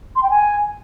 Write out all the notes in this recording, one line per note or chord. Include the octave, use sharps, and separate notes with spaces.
C6
G5
G#5